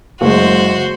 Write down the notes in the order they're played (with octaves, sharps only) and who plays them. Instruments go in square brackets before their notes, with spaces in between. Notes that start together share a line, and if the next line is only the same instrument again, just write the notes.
[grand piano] F#1 G#3 [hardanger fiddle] F#4 C5